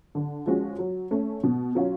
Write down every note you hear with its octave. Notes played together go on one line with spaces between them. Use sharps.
D3
F3 G#3 C#4 F#4
F#3
A3 C#4
B2
F#3 C#4 F4